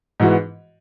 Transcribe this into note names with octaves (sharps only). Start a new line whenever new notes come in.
G#2 E3 B3 F#4